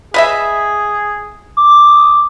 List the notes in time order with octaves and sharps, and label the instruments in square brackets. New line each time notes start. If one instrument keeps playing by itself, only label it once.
[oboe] G#4 [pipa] B4 D#5 E5
[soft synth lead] D6
[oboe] D#6